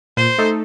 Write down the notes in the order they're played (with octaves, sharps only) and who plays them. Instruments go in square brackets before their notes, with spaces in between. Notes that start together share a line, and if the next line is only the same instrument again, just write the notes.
[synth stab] A#2 [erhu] C5
[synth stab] A3 D#4 A4